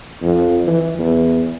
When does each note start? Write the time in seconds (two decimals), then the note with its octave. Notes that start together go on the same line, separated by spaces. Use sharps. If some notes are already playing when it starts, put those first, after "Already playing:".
0.22 F2
0.67 E3
0.99 E2